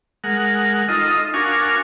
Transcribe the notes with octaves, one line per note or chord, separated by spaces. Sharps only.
G#3 A#4 F#5
D#4 F4 A4 D#5
D4 F#4 A#4 F5 G#5 C#6